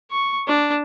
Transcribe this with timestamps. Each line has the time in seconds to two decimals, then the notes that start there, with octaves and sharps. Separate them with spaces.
0.11 C#6
0.48 D4